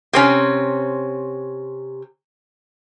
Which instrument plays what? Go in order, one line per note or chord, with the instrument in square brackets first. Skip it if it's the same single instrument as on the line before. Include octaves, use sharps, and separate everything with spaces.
[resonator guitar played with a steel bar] C3 C4 C#4